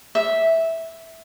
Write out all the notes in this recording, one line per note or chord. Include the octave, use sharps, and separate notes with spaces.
E5